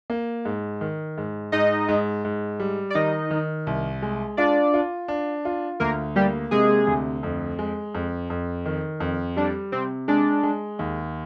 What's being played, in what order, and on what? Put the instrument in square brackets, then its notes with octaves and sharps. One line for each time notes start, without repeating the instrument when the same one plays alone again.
[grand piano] A#3
G#2
D#3
G#2
[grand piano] G#2 [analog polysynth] D#4 D#5
[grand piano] G#2
G#2
G3
[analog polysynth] D5
[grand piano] D#3 [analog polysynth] D#4 D#5
[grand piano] D#3
C2
G#3
[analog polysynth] D4 D5 [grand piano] F4
[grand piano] F4
D4
F4
[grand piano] D2 [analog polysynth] A#3 A#4
[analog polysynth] G3 G4 [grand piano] A#3
[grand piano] C3 [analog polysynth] G#3 G#4
[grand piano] D2
F2
G#3
F2
F2
D#3
F2
[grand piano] G3 [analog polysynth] D4
[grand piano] C3 [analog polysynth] C4
[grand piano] G#3 [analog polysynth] D4
[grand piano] G#3
D#2